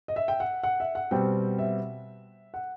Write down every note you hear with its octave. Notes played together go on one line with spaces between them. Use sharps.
D#5
E5
G5
F#5
F#5
E5
F#5
B2 G3 C4 G5
E5
F#5